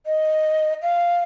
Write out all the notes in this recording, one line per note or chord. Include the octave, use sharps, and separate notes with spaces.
D#5
F5